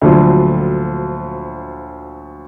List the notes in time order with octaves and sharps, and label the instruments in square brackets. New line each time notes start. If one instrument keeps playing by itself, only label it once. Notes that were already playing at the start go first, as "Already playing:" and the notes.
[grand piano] D2 A#2 D3 F3 F#3